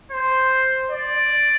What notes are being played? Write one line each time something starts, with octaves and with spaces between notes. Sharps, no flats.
C5
D5